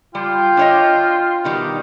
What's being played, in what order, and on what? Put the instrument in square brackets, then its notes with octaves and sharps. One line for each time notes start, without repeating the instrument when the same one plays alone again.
[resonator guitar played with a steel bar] G3 [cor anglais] F4 [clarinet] G5
[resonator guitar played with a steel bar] D4 C#5 D#5
B2 D#3 G3